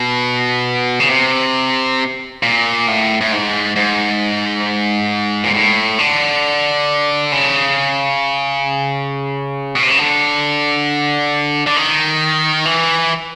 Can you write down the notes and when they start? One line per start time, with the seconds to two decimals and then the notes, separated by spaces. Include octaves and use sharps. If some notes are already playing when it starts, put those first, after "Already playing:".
Already playing: B2
1.00 C#3
1.10 C3
2.43 A#2
2.88 A2
3.21 A2
3.32 G#2
3.76 G#2
5.44 A#2
5.54 A2
5.99 D3
7.32 C#3
9.75 B2
9.83 C3
9.90 C#3
9.99 D3
11.67 D3
11.76 D#3
12.65 E3